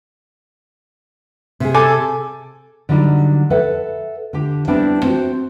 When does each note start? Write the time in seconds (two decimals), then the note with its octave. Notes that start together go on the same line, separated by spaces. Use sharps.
1.60 C3 G#4
1.74 A4 G#5 D6
2.89 D3 F#3 G3 D#4
3.50 A4 B4 E5 F#5
4.33 D3 G4
4.67 G3 B3 C4 D4 E4
5.03 C4 F#4